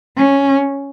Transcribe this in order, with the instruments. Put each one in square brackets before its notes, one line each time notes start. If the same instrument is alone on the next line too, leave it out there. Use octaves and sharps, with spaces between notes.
[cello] C#4